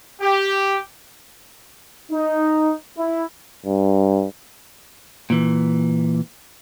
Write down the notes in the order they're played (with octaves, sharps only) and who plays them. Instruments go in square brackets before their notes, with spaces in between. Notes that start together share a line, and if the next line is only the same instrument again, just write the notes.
[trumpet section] G4
[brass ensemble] D#4
E4
[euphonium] G2
[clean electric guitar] A#2 E3